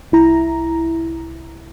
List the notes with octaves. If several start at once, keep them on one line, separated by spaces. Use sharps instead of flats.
C2 E4 A#5